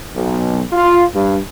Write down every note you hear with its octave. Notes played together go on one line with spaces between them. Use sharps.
B1
F4
G2